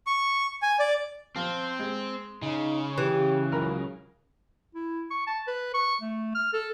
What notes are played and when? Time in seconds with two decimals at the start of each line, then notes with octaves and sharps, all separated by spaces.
0.07 C#6
0.62 G#5
0.79 D5
1.36 F3 C4
1.79 G#3
2.42 C#3 D#4
2.98 E3 G4
3.52 C#2 F#3 A#4 B5
4.75 E4
5.11 C#6
5.27 A5
5.47 B4
5.74 C#6
6.01 A3
6.35 F6
6.53 A4